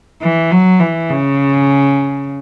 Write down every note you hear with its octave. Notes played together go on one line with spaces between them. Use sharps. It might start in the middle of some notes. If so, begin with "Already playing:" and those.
E3
F#3
E3
C#3